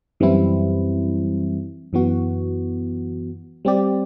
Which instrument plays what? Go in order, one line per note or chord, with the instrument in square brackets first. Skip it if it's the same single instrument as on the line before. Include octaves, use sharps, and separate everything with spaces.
[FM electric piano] F#2 E3 G3 C4 E4
F#2 E3 B3 F#4
G3 C4 G4 D5